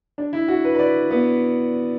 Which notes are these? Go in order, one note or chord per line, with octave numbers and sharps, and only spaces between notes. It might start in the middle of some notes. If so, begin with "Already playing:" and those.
D4
E4
F#4
B4
B4
D5
B3